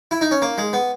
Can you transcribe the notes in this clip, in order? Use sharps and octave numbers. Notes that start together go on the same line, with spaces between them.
E4
D#4
C#4
A#3
G#3
B3